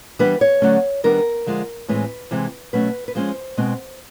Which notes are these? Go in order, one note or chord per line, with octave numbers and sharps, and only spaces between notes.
E3 G3 B3 D4 B4
C#5
D3 F#3 A3 C#4
D#3 G3 B3 D4 A#4
D3 F3 G#3
A2 E3 G#3 C4 B4
C3 E3 G#3 C4
B2 F#3 A3 C#4 B4
B4
F3 G#3 C#4 C5
B2 G#3 C4